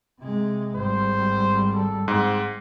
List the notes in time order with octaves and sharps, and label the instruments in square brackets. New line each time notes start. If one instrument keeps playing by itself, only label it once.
[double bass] C3 G#3
[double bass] G#1 G3 [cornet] C5
[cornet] A4
[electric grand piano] G#2 [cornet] C4